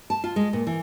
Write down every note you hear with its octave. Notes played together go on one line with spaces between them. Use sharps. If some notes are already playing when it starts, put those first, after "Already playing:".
A5
F4
G#3
A#2
E3